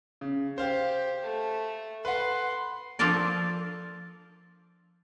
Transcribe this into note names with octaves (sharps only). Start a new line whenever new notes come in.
C#3
G4 C5 F5
A3
B4 F#5 C6
F3 D4 F4 A4 A#4 D5